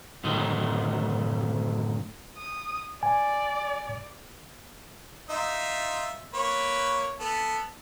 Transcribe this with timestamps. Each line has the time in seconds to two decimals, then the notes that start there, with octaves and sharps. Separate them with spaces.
0.24 F#2 A2 D3 D#3 D#4
2.38 D#6
3.03 D5 G#5
5.29 D#4 F4 E5
6.34 A#3 B4 C#5
7.20 B3 A4